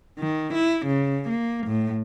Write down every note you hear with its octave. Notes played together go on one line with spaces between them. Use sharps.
D#3
E4
C#3
A#3
A2